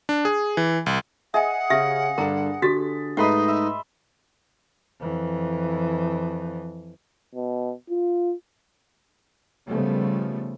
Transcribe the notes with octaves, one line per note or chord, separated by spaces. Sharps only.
D4
G#4
E3
C2
G#4 D#5 E5 F#5 G#5
C#3 C#4 G4 E5 A#6
G2 D3 D4 A#4 A#5
D3 F#4 G4 A4 A6 B6
G#2 A3 D#4 B4 D#5 B5 C6
E5
F2 E3
B2
F4
C#3 F3 G3 A3 B3